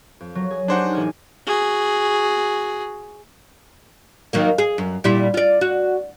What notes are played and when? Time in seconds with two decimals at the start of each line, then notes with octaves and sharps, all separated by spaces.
0.20 F2
0.35 F#3
0.51 G#4
0.68 D4 D#4 G4 C5 F#5 G#5
0.93 A1 G#5 F6
1.47 F#4 G#4
4.33 D#3 F#3 A#3
4.58 G#4
4.78 F#2
5.04 A#2 G3 E4
5.34 F4 D5
5.61 F#4